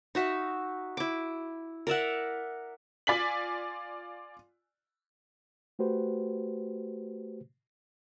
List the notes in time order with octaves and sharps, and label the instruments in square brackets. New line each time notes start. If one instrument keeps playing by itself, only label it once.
[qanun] D#4 F#4 E5
E4 D6
A#4 D5 E5 F#5
[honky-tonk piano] F4 D5 G#5 B6 F#7
[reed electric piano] A3 F#4 G4 B4 C5